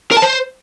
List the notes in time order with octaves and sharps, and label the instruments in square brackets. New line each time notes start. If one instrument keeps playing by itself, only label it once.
[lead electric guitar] A#4
A5
C5